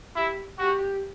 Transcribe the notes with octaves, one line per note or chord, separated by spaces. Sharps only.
E4 G4
F#4 G4